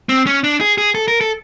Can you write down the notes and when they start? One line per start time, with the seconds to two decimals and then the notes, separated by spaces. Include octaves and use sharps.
0.09 C4
0.27 C#4
0.44 D4
0.61 G#4
0.78 G#4
0.95 A4
1.08 A#4
1.21 A4